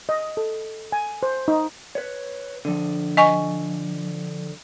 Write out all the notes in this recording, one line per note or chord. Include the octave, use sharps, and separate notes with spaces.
D#5
A4
G#5
C5
D#4
B4 C#5
D3 F3
D#5 G#5 C#6